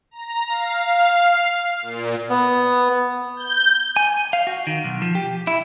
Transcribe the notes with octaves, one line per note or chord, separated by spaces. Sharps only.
A#5
F5
A#2
B3
G6
G#5
F5
F#4
D#3
B1
F3
G4
E4